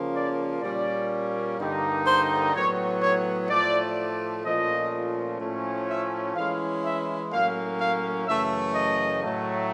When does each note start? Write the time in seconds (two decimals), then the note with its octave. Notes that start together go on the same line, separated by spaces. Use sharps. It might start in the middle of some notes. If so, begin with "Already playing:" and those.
Already playing: C#3 F3 A#3 C#4
0.15 D5
0.62 A#2 G3 A#3 C#4 D5
1.59 G2 D3 G3 A#3 D#4
2.06 C5
2.54 A2 F#3 B3 C#5
3.01 C#5
3.49 A2 F3 A3 D5
4.45 A#2 F3 A3 C#4 D#5
5.40 A2 F3 A3 C#4
5.89 E5
6.36 E3 G#3 C#4 E4 F5
6.84 E5
7.31 A2 F#3 A#3 C#4 F5
7.79 F5
8.27 F#2 C#3 E3 A3 E5
8.75 D#5
9.23 A2 F#3 A3